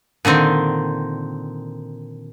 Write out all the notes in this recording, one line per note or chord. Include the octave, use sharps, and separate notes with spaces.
A#2 D3 D#3 C4